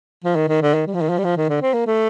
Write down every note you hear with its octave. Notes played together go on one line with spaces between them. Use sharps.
F3
D#3
D#3
D3
D#3
G3
F3
D#3
F3
G3
F3
D#3
D3
C4
A#3
A3